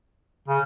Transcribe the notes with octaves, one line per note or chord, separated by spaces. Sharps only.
C#3